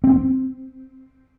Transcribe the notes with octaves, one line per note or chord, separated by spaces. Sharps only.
C4